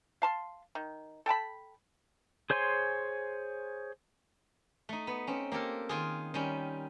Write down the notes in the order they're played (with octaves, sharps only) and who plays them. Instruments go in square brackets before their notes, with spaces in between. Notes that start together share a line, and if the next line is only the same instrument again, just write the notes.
[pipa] F5 A5 C6
D#3
A4 G5 A5 B5
[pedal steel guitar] G#4 C5 C#5 G#5 C6
[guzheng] A3 D#4
B3 B5
C4 C#4
A#3 G4 A4 A#4
D#3 F4 G#4
D#3 G3 C#4